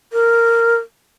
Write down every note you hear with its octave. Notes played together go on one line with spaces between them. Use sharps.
A#4